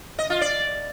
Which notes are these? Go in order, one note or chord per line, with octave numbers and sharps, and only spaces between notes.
D#5
F4
D5